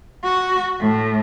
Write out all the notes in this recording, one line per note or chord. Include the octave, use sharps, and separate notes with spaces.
F#4
A2